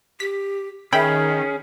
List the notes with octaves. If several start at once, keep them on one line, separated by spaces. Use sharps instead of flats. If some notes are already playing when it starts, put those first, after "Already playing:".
G4 B6
D#3 C#4 G#4 E5 G5 B5